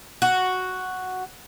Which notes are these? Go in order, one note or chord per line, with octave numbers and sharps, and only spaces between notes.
F#4